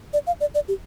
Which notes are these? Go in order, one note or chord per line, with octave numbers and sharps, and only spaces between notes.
D5
F5
D5
D5
G4